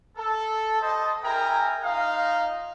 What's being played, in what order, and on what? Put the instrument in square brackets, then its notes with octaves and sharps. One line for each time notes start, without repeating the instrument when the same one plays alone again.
[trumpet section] A4
G3 C5 D#5 A5
E4 G#4 A#4 G5 G#5 A#5
D#4 F4 D#5 F5